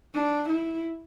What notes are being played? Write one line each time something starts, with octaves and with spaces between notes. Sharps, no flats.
D4
E4